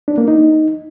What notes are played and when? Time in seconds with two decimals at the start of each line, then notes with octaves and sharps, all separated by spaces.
0.08 D4
0.18 A#3
0.28 D#4